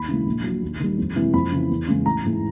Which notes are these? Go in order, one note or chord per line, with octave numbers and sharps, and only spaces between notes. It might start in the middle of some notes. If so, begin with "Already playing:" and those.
Already playing: D#2 B5
C#3 E3 G#3
A#1
A#2 F#3
D#2
D#3 G3
F2
C3 E3 G#3
F2 B5
C#3 E3
E2
C#3 E3 G#3
A1 A#5
G#2 E3 G#3